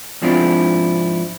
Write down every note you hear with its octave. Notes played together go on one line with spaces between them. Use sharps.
G#2 F3 C4 D4 E4